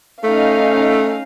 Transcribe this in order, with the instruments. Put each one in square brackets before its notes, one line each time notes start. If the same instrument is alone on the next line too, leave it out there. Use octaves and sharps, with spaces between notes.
[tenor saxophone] A3 [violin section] C#4 D#4 F5